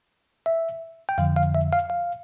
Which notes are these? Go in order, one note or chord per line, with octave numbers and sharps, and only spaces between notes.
E5
G5
F2 D3 F3 F5
F5
E5
F5
F5